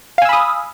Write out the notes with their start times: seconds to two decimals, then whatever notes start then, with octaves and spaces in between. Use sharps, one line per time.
0.18 F5
0.22 G#5
0.25 E6
0.29 B5
0.33 D#6